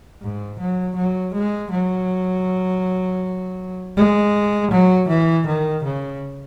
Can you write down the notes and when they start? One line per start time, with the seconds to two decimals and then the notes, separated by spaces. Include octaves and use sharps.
0.22 G#2
0.59 F#3
0.96 F#3
1.34 G#3
1.71 F#3
3.96 G#3
4.71 F#3
5.08 E3
5.46 D#3
5.83 C#3